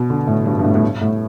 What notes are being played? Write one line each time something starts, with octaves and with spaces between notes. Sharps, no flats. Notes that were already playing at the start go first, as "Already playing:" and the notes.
Already playing: B2
D3
A2
G2
G2
A2
A2
G2
A2